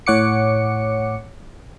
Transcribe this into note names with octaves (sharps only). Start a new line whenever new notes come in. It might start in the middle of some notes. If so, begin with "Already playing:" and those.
A2 C#5 F#5 D6 C#7